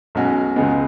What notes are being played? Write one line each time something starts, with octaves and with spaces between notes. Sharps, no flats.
B1 B2 G#3 C#4 F#4
C#2 C#3 G#3 B3